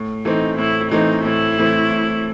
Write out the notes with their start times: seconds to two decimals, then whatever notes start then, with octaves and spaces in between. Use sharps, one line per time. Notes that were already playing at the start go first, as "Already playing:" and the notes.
Already playing: A2
0.25 E3 A3 C4 D#4
0.58 A2 E4
0.91 E3 A3 C4 D#4
1.25 A2 E4
1.58 E3 A3 C4
1.91 A2